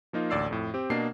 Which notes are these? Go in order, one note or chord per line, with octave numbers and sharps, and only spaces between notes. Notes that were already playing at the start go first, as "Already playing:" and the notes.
F3 A#3 D#4 F4
A1 D2 D5 E6 C7
F2 A2
C4 G4
B2 A#3 D4 D#5 C7